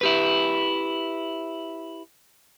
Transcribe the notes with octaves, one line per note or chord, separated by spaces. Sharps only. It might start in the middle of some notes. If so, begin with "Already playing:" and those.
E4 G4 B4